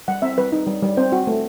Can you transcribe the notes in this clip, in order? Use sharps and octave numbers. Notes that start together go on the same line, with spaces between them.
G3 F#5
C4 E5
G3 B4
D#4
G3
G3
C4 C5
F#4
A3